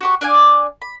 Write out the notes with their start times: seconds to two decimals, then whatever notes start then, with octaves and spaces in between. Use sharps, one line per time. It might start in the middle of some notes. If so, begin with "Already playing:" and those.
0.01 F#4 G4 C#6
0.21 D4 D5 F5 G#5
0.82 B5